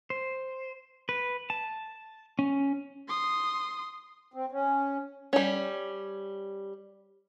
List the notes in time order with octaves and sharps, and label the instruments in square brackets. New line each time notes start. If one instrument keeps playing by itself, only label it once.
[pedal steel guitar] C5
B4
A5
C#4
[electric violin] C6 D#6
[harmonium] C4
C#4
[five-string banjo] G3 C#4